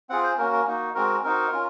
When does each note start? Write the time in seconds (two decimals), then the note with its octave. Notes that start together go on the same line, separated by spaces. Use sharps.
0.09 C4 F4 G#4 F#5
0.23 C5
0.38 A#3 C#4 F#4 A#4
0.52 A#4
0.67 A#3 D#4 F#4
0.95 G#3 C4 F#4 A#4
1.24 C4 D#4 F#4 A#4
1.52 C#4 F4